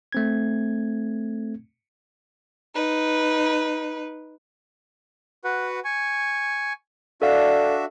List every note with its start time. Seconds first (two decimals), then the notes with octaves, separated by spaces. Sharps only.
0.12 A3 C4 G#6
2.75 D#4 B4
5.44 F#4 B4 F#5
5.84 G#5 C#6
7.22 D4 F#4 A4 D5 E5 F5